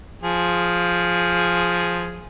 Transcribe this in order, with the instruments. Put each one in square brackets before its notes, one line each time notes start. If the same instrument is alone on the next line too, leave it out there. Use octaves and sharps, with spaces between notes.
[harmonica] F3 G#4